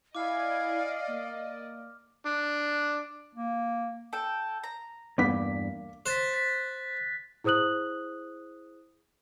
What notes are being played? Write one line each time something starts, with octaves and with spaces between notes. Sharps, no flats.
E4 D5 D#5 F5 G#5 D6 F6 G#6
A#3
D4
A#3
A4 G5
A#5
E2 G2 A#3 B3 D6 B6
C5 F#6 A6 B6
A6 B6
E4 G#4 C5 D#6 F#6 F#7